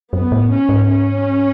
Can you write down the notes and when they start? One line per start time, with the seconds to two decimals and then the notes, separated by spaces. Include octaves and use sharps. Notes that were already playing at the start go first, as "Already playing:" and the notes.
0.13 F#2 B3
0.32 A2
0.50 C#4
0.69 G#2
0.86 C#4